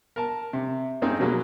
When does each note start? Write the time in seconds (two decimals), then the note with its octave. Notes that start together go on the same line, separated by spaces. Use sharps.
0.16 A#4 A5
0.53 C3
1.02 G2 G#3 C4 D#4 G#4
1.20 B2 F#3 G#3 A#3